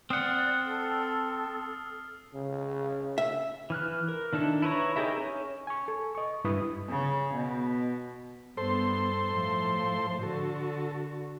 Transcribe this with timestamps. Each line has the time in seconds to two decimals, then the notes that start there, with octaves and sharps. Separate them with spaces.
0.10 C4 D5 F#5 D#6 F6 C7
0.64 A4
2.34 C#3
3.18 E5
3.70 E3 F6 F#6
4.09 A#4
4.33 D#3 D4 E4 A4
4.62 E4 B4 C#5 A#5
4.96 D#4 G4 G#4 A#4 E5
5.18 C#4
5.67 G#5 C#6
5.88 A4
6.15 D#5 C#6
6.44 G2 E4 B4 D#6
6.89 C#3
7.34 B2
8.57 G2 B3 A4 C5 C6
9.31 A2 F3
10.23 D3 F#4 A4